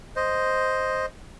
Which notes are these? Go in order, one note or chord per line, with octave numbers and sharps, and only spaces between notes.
C5 D#5